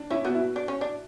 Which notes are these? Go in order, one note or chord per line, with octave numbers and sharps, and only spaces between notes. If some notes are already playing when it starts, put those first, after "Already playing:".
Already playing: D4
C#4 E4
B3 F#4
E4
F#4
D4
C#4
D4